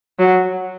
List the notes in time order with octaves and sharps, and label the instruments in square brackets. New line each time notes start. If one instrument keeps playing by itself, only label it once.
[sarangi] F#3